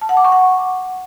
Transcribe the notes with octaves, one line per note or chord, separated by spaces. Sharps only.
A5
F#5
D6
C#6
F#5